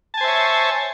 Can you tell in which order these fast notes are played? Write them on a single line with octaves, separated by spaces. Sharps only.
A5 G#5 C5 E5 C#5